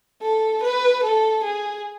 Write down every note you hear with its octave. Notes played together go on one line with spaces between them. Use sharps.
A4
B4
A4
G#4